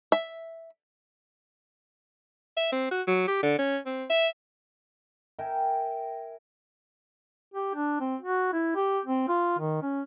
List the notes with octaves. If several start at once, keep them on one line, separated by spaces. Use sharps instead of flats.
E5
E5
C4
F#4
F#3
G4
D3
C#4
C4
E5
A#4 E5 G5 G#5
G4
D4
C4
F#4
E4
G4
C4
F4
D#3
C#4